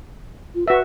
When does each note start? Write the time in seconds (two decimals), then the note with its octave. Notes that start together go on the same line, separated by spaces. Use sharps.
0.55 F4
0.68 F#4 B4 E5